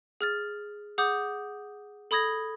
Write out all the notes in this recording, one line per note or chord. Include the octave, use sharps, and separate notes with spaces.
G#4 F6 A6
G#4 F#5 D6 D#6 G6
A4 B5 D#6 G#6 A#6